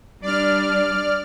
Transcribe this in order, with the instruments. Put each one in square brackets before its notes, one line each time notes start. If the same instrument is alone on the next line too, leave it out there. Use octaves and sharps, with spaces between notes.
[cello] G3 D4 [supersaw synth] D5 F6